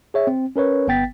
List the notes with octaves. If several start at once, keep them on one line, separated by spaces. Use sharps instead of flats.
G#4 C#5 E5
C4
C#4 A#4 B4 C#5
G1 B3 G5 A6 B6